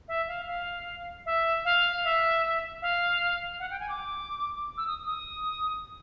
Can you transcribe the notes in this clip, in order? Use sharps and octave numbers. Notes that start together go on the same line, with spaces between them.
E5
F5
F5
E5
F5
E5
F5
F#5
G5
G#5
D6
E6
D#6
D#6